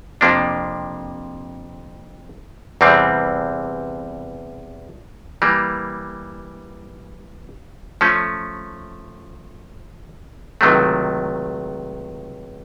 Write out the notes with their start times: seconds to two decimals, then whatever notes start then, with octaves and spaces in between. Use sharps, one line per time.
0.21 F2 C3 F3 A#3 D4
2.81 E2 C3 E3 G3 C4
5.42 E3 G3 A#3
8.01 F3 A3 C#4
10.61 C#2 C3 D#3 F#3 A3